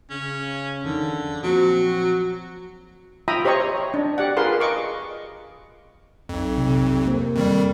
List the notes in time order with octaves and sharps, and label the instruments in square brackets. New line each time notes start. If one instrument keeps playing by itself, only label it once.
[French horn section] C#3 [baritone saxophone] C#4
[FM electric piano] F2 D#3 [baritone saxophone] D3
[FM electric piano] A#2 F3 [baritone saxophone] F#3 [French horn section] C4 [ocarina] F#4
[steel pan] F4 E5 G5 A#5 B5 D#6
G4 C5 C#5 D#5 A#5 C#6
D4
G4 D5 F#5
F4 G#4 A#4 B4 F5 C6
D#5 C#6 D6
[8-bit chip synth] B1 F2
[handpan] C3
A#3 C5
[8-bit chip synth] F2 D#3 G3